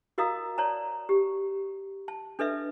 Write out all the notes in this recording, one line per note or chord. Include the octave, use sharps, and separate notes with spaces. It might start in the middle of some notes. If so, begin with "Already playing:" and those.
F#4 A#4 D#5 F5 A#5 D#6
C#5 D5 A5 A#5
G4
A5
D4 A4 B4 D#5 E5